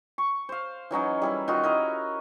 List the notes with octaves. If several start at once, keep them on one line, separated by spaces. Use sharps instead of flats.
C#6
C5 F5
E3 F#3 C#4 D#4
G3 E4 A#4
D#3 F4 F#4 D#5
E4 A#4 D#5